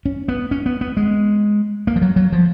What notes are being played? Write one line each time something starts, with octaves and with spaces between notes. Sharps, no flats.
C#4
B3
C#4
B3
B3
G#3
A#3
F3
F#3
F#3
F3